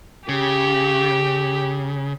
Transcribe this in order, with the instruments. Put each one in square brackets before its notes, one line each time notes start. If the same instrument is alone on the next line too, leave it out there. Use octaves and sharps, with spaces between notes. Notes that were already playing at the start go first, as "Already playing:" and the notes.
[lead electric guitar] C#3 [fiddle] G4